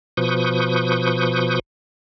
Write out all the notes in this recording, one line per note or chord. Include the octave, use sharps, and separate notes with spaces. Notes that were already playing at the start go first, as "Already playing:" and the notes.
B2 F3 B4 C#6 D#6 G6